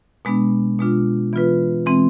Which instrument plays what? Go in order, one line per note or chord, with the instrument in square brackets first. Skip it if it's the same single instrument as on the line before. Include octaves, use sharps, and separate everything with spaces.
[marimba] B2 G#3 B3 D4
B2 G#3 D4 F4
E3 B3 F4 B4
E3 G#3 C4